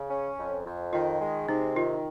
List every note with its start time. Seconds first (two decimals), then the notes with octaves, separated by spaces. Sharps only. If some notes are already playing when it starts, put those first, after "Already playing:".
Already playing: C#3 G#4
0.10 C#4
0.38 F2
0.66 F2
0.93 D#3 F4
1.21 G#3
1.48 C3 D#4
1.75 D#3 F4